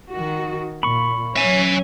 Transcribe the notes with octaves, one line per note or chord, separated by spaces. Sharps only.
D#3 F#4
A#2 B5 C#6
F#3 C#4 E5 G#5